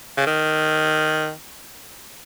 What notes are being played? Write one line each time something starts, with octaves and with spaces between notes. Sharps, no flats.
C#3
D#3